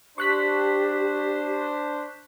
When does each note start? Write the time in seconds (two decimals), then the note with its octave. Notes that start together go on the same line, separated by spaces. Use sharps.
0.18 D4 G4 C5 C#6 F#6 B6